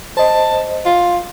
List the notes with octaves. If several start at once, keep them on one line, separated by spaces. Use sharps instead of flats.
C5 D#5 A5
F4